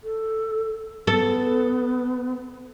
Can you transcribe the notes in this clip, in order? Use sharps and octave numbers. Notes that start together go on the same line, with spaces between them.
A4
B3 A4